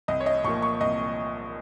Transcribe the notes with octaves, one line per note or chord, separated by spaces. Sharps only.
C2 D#5
C#5
D#5
A#2 F3 A#3 C#6
C#6
C2 D#5